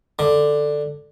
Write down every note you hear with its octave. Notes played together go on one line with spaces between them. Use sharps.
D3